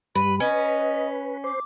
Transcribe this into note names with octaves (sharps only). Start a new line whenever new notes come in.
G2 G3 B4 B5
C#4 B4 D#5
C5 D6